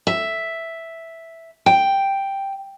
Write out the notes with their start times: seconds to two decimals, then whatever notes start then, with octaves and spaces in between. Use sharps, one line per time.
0.07 E5
1.66 G5